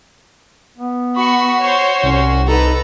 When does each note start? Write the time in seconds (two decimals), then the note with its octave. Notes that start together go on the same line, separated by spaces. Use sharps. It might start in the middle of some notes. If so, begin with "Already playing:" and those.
0.78 B3
1.16 F#4 B5 C#6
1.61 C5 C#5
2.03 C2 C#4
2.47 D#4 A4 B4 A#5